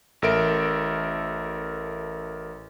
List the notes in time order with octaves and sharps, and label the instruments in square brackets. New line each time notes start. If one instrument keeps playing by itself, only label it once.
[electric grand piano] A1 A4 A#4 E5 D7